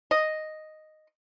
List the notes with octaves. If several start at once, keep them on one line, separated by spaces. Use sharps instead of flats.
D#5